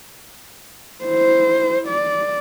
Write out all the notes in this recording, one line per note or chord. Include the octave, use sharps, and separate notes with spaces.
E4 C5
D5